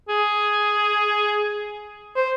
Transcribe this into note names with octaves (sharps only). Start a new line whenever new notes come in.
G#4
C5